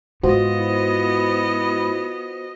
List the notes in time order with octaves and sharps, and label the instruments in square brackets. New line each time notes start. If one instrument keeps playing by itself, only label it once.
[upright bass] G#2 [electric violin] B3 D#5 [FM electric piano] F4 F#4 C5
[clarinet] E4